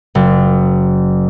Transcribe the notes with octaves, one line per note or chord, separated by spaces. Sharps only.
F#1